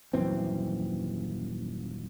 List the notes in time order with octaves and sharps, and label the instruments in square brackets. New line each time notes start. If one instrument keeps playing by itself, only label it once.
[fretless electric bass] D#1 F#2 E3 C4